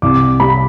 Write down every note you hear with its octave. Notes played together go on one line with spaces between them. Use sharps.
C2 D6
G3 B5